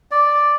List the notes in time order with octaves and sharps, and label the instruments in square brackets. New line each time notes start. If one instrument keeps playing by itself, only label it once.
[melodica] D5